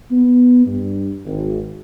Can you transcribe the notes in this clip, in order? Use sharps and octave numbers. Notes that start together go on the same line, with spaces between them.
B3
G2
G#1